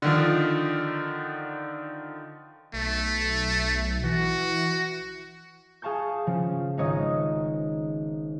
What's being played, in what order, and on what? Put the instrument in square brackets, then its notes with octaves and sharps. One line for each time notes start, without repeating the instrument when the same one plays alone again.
[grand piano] D3 D#3 F3
[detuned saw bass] B1 [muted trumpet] A3
[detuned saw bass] E3 [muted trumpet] F#4
[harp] G#4 F5 A5 C#6 G6
C#3 F3 C#4
G#1 D#4 C#5 D#5 D#6